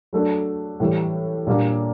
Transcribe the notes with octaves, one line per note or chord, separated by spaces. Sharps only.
F#3 A3 D4
A2 E3 G3
A#2 G3 A#3 D4